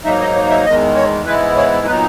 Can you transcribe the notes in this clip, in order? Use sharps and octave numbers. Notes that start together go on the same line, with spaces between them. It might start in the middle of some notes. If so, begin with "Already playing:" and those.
G#2 F#3 A#3 D#4 E5
D#5
C#5
E5
E2 D#3 G#3 D#5
C#5
G#2 E3 G#3 B3 E4 B4
C#5
A#2 F#3 B3 D#4 B4